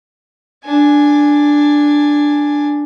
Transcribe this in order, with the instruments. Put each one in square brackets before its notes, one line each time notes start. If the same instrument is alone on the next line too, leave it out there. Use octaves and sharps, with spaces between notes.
[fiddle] D4 G#5